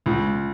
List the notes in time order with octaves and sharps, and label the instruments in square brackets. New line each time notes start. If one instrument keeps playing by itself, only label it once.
[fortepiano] C#2